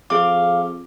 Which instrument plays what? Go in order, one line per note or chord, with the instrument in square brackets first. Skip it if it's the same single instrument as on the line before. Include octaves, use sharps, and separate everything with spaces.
[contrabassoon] F2 [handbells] G#4 D6 [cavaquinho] F5